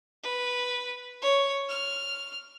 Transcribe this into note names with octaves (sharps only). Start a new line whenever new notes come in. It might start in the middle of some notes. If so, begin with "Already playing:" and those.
B4
C#5
F6